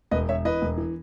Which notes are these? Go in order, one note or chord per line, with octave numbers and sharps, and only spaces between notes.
E1 B4 D#5
E1 C#5 E5
E3 B4 D#5
E1
E3